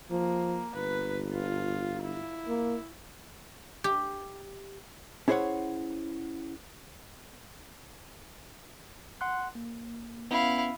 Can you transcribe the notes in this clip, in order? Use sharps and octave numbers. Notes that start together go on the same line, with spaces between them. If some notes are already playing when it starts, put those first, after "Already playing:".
F3 A#3
G1 B4
F4
E4
A#3
G4
C#4 E4 G#4 C5 C#5 F#5
F#5 C6 F#6
A#3
B3 C#4 E4 F5